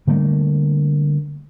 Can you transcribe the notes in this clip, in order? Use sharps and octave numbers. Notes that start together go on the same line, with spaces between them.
D3 G3 A3 A#3